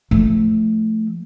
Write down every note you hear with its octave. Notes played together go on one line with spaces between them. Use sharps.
F3 A3